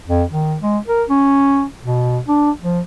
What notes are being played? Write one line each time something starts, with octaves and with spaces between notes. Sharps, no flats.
F2
D#3
G#3
A#4
C#4
B2
D4
F3